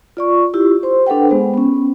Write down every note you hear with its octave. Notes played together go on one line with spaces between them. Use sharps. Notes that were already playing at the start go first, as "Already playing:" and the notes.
F4 D5 C#6
E4 F4 G4 E6
C5 C6
D4 A4 B4 F#5 G5
G#3 B3 G#4 C5
B3 C#4